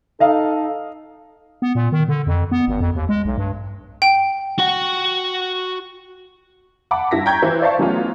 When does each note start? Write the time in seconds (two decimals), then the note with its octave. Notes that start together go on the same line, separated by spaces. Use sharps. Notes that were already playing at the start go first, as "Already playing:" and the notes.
0.20 D#4 A4 D#5 F5
1.62 B3
1.75 A#2
1.92 D#3
2.09 D3
2.27 F2
2.52 B3
2.68 G#1
2.80 F2
2.95 D#2
3.09 G#3
3.25 B1
3.38 G2
4.02 G5
4.59 F#4 F#5
6.91 F#5 A5 B5 D6
7.11 G2 E4 A#6 B6
7.26 G5 A#5 C#6 G6 G#6
7.42 E3 E4 B4 C5
7.61 C5 D5 E5 F5 A5 C#6
7.79 E3 F#3 A3 B3 C#4 F4